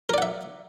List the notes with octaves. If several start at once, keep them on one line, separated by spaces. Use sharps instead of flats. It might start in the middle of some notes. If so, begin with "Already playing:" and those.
A#4 D5 E5 F#5